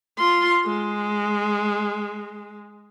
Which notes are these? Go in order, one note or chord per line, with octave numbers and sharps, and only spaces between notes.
F4 C6
G#3